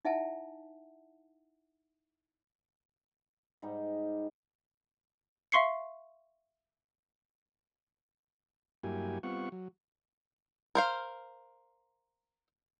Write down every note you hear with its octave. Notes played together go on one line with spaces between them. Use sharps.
D#4 E4 E5 F#5 G#5 A5
G#2 G3 D#4
E5 F5 C6 C#6 C7 C#7
G2 F#3 A#3 E4 G4 G#5
G3 B3 C4 F4 F#5 C#6
F#3
A#4 C5 F5